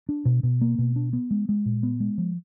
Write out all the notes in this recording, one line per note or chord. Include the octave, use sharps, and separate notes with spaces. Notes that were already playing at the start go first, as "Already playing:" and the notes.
D4
B2
B2
A#3
B2
D4
B3
G#3
G#3
A#2
B3
G#3
F3